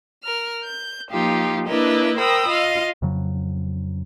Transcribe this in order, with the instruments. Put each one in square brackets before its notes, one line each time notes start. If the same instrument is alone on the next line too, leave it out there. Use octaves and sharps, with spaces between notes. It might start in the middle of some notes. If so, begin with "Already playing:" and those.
[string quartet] A#4 F6
G6
F3 A#3 D#4 F4 G4
A#3 D4 E4 A#4 B4 D#5
A#4 C5 G5 B5 D#6 E6
F4 D#5 F5
[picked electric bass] F2 C#3 F#3